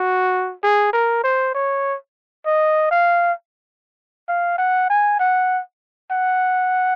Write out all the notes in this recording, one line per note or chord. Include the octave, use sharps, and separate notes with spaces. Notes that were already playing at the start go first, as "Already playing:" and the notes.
Already playing: F#4
G#4
A#4
C5
C#5
D#5
F5
F5
F#5
G#5
F#5
F#5